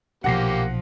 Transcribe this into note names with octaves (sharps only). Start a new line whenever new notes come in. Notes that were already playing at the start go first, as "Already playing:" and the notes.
B1 A#2 F3 A#3 G4 F#5 A#6 C7